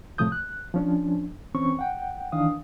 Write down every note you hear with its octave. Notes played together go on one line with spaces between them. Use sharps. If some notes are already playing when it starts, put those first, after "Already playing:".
A2 C3 F3 A3 D#6 G6
F#6
F3 C#4 D4
E3 C4 C#4 C#6
F#5 G5
D#3 E3 D4 F5 D#6